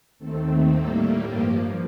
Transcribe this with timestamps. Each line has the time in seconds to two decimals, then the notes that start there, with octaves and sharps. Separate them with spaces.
0.19 D#2 D#3 A3 C4 A4
0.72 A2 G3 A#3 A4
1.24 G2 F3 A#3 G4